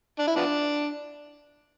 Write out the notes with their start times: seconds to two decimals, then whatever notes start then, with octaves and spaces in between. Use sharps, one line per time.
0.19 D4
0.27 E4
0.36 F3 B3 D4